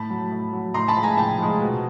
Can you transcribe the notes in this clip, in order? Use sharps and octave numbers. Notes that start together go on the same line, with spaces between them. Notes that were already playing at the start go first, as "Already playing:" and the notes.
Already playing: A2 A5 B5
F#3
A2
F#3
A2 A#5 C6
A5 B5
F3 G#3
G#5 A#5
A2 G5 A5
F3 G#3
B2